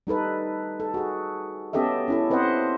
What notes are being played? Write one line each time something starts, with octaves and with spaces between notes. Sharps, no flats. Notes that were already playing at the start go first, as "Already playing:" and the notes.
G3 D#4 A4 B4
A4
F#4 G#4
B3 C#4 G4 A4 D#5 E5
C#4 E4 A4
C4 B4 C5 D#5 E5 F#5